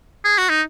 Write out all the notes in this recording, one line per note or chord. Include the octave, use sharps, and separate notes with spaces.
G#4
F#4
D#4